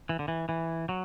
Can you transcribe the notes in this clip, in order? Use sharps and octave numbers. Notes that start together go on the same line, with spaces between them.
E3
D3
E3
E3
F#3